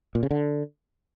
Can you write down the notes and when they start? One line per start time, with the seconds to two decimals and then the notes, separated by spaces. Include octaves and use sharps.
0.15 A#2
0.23 C#3
0.31 D3